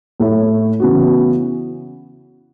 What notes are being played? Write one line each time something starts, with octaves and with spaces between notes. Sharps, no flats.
A2 A3 E4 C#5
C#3 E3 B3 F#4